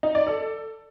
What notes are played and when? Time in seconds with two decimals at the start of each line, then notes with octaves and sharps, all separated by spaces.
0.03 D#4
0.15 D5
0.27 A4